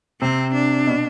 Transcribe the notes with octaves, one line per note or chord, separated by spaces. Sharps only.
C3 C4
D4
B2